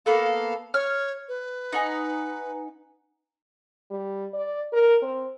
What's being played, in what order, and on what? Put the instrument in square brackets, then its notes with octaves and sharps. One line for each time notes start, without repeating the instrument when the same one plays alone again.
[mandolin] A#3 B3 A4 [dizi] F5
[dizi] C#5 [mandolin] F6
[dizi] B4
[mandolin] D#4 F#5 G#5
[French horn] G3
D5
A#4
C4